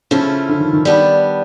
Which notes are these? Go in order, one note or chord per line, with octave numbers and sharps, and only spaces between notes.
C#3 F3 A3 C#4 E4
D3
D#3
D#3
G3 B3 D4